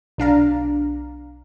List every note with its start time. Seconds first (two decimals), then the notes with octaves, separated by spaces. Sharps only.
0.18 B1 D4 F5 A#5